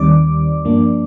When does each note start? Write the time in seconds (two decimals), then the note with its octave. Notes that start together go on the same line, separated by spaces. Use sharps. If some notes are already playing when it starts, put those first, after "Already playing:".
Already playing: D#2 D#3 G3 C4 D5 D6
0.65 G2 F3 A#3 D4